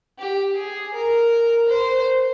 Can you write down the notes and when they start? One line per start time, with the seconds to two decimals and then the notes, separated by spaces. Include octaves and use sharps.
0.19 G4
0.56 G#4
0.94 A#4
1.68 C5